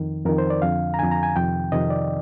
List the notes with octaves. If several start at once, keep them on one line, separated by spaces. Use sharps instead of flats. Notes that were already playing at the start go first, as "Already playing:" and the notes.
Already playing: F2 D#3
F2 D#3 A#4
C5
D5
F2 D3 F5
A#5
F2 D3 G#5
A#5
G#5
F2 C3 D#3 G5
F2 C3 D#3 D#5
D5